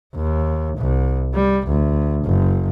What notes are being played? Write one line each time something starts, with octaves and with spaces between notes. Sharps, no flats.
D#2
C2
G3
D2
F#1